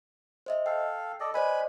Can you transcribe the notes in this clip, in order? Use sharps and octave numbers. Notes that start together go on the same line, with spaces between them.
C5 D#5 E5
A4 F5 G5
A4 D5 D#5
B4 C5 D5 D#5 G#5 B5